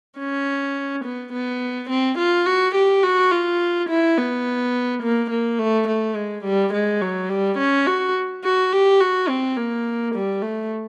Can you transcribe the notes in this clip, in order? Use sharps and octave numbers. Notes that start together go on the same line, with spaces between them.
C#4
B3
B3
C4
F4
F#4
G4
F#4
F4
E4
B3
A#3
A#3
A3
A3
G#3
G3
G#3
F#3
G3
C#4
F#4
F#4
G4
F#4
C4
A#3
G3
A3